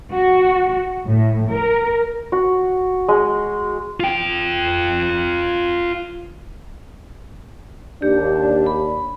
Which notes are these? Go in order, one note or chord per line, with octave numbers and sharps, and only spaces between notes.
F#4
A2
A#4
F#4
G#3
F4 G5
D#2 D4 G4
B5